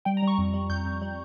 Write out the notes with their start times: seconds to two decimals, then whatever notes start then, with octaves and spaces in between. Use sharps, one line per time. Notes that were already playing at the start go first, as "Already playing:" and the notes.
0.05 G3 G5
0.17 A#5
0.22 G3
0.27 C#6
0.38 F2
0.54 G3
0.70 F2 G6
0.86 F2
1.02 G3